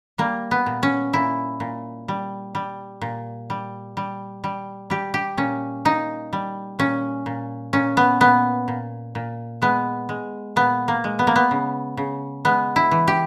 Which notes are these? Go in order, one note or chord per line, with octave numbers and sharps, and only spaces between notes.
G3 A#3
B3
A#2
C#4
A#2 E4
A#2
G3
G3
A#2
G3
G3
G3
G3 G4
G4
A#2 C#4
A#2 D#4
G3
A#2 C#4
A#2
A#2 C#4
B3
A#2 B3
A#2
A#2
G#3 B3
G#3
A#2 B3
A#3
G#3
B3
A#3
B3
C#3
C#3
G#3 B3
E4
E3
G4